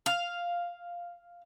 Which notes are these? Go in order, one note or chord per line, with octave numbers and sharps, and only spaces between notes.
F5